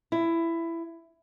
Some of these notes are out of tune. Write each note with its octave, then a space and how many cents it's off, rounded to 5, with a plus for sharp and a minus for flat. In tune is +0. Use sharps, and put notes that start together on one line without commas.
E4 +15